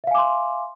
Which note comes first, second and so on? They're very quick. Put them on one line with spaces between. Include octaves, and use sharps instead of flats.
E5 F5 G#5 D6 C6